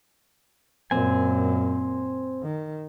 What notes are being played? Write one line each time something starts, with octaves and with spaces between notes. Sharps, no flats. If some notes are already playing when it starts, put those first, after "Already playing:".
F#2 A#2 C4 G#5
D#3